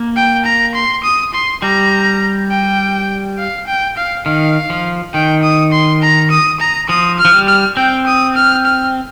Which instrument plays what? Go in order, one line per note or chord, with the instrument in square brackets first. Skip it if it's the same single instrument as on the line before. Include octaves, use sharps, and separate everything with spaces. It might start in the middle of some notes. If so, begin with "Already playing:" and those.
Already playing: [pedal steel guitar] A#3
[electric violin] G5
A#5
C6
D#6
C6
[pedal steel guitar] G3 [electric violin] A#5
[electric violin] G5
F5
G5
F5
[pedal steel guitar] D#3 [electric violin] F5
[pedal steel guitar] F3
[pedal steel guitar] D#3 [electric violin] G5
[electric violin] D#6
C6
A#5
D#6
A#5
[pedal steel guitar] F3 [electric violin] D#6
[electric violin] F6
[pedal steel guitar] F3
G3
[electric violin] F6
[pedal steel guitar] C4 [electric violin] G5
[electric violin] D#6
F6
F6